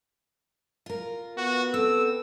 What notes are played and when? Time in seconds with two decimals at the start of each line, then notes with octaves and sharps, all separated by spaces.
0.86 F4 A#4
1.37 B3 F#4
1.74 C4 A4 E6